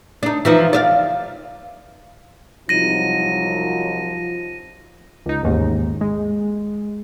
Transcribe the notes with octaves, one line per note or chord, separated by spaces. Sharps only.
D4 D#4
E3 F3 D#4
D5 E5 F5
C2 F3 F#3 D#4 A#6 D#7
C#2 D#4
A1 D#2 G#2
G#3